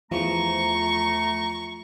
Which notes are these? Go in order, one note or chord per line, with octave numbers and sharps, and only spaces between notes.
E2 F3 A3 A#5 C#6